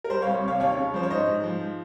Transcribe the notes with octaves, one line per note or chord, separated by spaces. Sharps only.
A#4
G3 C5
C2 C#5 F5
C3 C#5 F5
D#2 C#5 F5
C#3
F3 C5
C#5
G#2 C5 D#5
G#2
F3